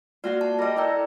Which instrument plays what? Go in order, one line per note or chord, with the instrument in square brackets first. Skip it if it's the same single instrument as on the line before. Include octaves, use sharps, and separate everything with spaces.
[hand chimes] A#3 D5 [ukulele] F4 F#4 F5
[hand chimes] A5
[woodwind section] G3 [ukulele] A#4 D#5
[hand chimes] E4 D5 G5 [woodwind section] A4 A#5